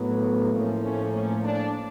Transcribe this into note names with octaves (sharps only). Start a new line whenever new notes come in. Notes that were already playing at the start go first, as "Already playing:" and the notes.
Already playing: A2 F#3 B3
A2 F3 A#3 C#4
C#4
C#4
D4